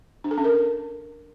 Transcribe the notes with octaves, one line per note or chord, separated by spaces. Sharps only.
D4
A4
C#4
A#4